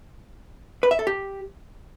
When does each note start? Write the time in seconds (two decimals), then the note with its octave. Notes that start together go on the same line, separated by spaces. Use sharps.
0.83 B4
0.91 E5
0.99 A4
1.07 G4